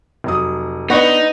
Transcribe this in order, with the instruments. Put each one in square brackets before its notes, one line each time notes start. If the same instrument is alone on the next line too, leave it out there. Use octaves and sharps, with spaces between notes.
[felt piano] F1 F#3 D#6
[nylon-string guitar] B3 D4 [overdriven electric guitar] D#4 [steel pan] B4 F#5 C#6